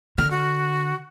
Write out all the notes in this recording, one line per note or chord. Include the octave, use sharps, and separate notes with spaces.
D3 F6
F#4